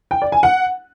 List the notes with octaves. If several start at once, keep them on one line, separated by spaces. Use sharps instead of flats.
G5
D5
G#5
F#5